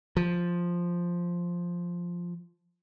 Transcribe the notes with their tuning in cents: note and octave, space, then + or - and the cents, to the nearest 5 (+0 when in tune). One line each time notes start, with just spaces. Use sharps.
F3 +0